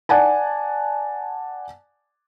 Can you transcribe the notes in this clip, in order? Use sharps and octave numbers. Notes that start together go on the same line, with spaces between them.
D5 F#5 G#5 A5